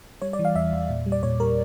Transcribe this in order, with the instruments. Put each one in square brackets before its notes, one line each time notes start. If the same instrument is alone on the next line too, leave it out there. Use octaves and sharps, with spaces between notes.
[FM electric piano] G3 C#5
D5
E3
F5
E2 E5
E2
A#2
G3
D5
A#2 C#5
G3 A#4